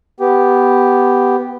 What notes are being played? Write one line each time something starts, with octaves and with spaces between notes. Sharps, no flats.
B3 G4